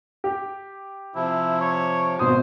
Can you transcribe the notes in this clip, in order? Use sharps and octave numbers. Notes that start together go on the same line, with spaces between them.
G4
C3 F3 E4
C#5
G#1 B2 C5 D#6